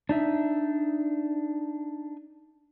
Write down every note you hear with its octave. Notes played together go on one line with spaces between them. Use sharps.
D4 D#4 E5